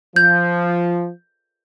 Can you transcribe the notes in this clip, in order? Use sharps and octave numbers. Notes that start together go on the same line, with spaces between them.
F3 G6